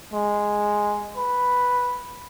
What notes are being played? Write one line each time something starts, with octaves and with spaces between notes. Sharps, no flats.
G#3
B4